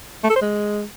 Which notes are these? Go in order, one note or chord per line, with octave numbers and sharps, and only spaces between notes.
A3
A4
C5
G#3